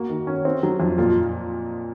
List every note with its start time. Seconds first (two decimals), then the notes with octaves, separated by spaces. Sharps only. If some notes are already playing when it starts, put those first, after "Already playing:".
Already playing: A#3 F#4
0.10 D#3
0.27 C#4
0.45 C4
0.63 F#3
0.80 F2
0.98 A#2 F4